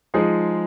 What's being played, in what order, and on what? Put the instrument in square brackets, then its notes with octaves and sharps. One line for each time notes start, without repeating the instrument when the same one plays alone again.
[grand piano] F3 G#3 D#4 G#4